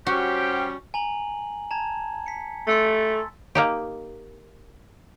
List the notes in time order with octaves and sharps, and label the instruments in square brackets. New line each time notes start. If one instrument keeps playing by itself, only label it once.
[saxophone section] G3 C#4 [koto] F#4 [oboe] G4 [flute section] C5 F#5 G5
[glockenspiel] G#5 A#5 F#7
A5 A#5 G#6
B6 C#7
[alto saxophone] A3 [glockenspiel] C6 E6 A6
[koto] A#3 D#4 G4